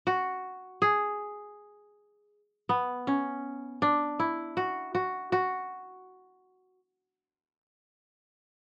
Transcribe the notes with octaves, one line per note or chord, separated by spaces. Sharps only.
F#4
G#4
B3
C#4
D4
E4
F#4
F#4
F#4